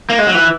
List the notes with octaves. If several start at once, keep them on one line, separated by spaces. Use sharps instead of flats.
A#3
G#3
F#3
E3